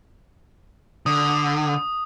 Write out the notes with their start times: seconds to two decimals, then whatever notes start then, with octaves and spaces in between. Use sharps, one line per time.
1.06 D3 D#6